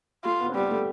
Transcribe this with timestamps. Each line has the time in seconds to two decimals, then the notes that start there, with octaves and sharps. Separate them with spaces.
0.24 A3 F4
0.40 B3
0.49 C4
0.55 G3 B3
0.71 A3